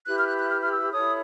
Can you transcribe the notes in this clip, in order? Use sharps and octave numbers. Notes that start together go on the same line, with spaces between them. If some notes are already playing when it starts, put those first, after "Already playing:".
E4 G4 B4 F#6
F6
F#6
F#6
F6
F6
E6
E4 A4 C#5 D#6